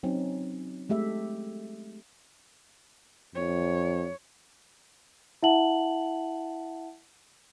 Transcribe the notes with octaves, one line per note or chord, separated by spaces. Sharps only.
F#3 C4 C#4 D#4
G#3 A3 G4 E5
F2 C#5
E4 E5 F#5 A5 F#7